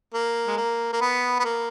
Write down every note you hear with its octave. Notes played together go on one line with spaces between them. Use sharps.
A#3
G#3
A#3
A#3
B3
B3
A#3